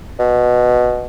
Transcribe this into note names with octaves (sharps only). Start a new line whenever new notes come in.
B2